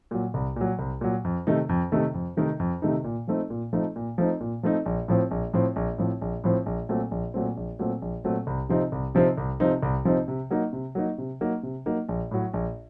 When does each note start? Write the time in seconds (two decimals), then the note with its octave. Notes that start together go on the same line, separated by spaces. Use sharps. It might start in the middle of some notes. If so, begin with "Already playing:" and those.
0.11 A#2 F#3
0.34 C2
0.56 A#2 F#3
0.79 C2
1.01 A#2 F#3
1.25 F2
1.47 C3 D#3 A3 D#4
1.69 F2
1.92 C3 D#3 A3 D#4
2.14 F2
2.37 C3 D#3 A3 D#4
2.60 F2
2.82 C3 D#3 A3 D#4
3.04 A#2
3.27 F3 A3 C4 D#4
3.50 A#2
3.73 F3 A3 C4 D#4
3.96 A#2
4.18 F3 A3 C4 D#4
4.40 A#2
4.63 F3 A3 C4 D#4
4.86 A#1
5.08 A2 F3 C4
5.31 A#1
5.53 A2 F3 C4
5.76 A#1
5.98 A2 F3 C4
6.21 A#1
6.44 A2 F3 C4
6.66 A#1
6.89 A#2 F#3 A3 C4
7.11 A#1
7.34 A#2 F#3 A3 C4
7.57 A#1
7.79 A#2 F#3 A3 C4
8.02 A#1
8.24 A#2 F#3 A3 C4
8.47 C2
8.69 C3 F3 C4 D#4
8.92 C2
9.15 C3 F3 C4 D#4
9.38 C2
9.60 C3 F3 C4 D#4
9.83 C2
10.05 C3 F3 C4 D#4
10.28 C3
10.50 F#3 A#3 D#4
10.73 C3
10.95 F#3 A#3 D#4
11.18 C3
11.41 F#3 A#3 D#4
11.63 C3
11.86 F#3 A#3 D#4
12.09 A#1
12.31 A2 F#3
12.54 A#1